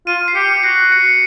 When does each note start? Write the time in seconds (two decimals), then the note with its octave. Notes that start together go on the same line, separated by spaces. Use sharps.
0.07 F4 D#7
0.28 C7
0.35 G4 C#7
0.63 F#4 C7
0.92 C#7